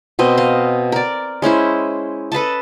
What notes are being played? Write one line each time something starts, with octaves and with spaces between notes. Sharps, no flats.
B2 C4 D#5
D#5 F5
A#4 D5
G#3 C#4 E4 C5
A4 B4 D#5 A5